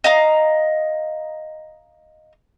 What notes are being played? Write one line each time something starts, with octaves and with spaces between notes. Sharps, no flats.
D#5 F5 A#5